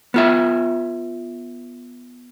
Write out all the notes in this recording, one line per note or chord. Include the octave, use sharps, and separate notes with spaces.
B3 F4 E5